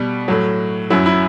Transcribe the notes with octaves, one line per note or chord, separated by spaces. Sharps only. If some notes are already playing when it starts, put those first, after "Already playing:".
Already playing: B2 G3
A2 F#3
F#2 F#3 E4
E4